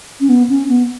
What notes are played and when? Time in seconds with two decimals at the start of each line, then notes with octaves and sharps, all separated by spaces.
0.20 C#4
0.29 B3
0.49 C#4
0.69 B3